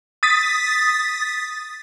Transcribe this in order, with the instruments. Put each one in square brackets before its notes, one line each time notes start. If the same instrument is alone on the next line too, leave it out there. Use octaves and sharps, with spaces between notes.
[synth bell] D#6 A6 B6